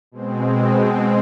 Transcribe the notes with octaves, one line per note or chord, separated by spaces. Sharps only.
B2 G#3 C4